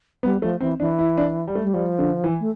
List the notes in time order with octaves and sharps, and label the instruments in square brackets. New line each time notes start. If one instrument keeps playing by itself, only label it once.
[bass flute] G3 [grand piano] B3
[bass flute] F3 [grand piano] A3
[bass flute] E3 [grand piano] C4
[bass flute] E3 [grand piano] D4
[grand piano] E4
D4
G3
A3
[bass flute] G3
[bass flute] F3 [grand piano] G3
[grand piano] D3
E3
[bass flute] A3